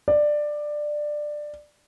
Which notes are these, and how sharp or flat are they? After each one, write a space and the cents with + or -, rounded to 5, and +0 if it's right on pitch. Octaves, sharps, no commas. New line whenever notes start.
D5 +15